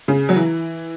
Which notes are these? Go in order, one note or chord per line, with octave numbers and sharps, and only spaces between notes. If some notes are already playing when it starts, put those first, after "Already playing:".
C#3
F#3
E3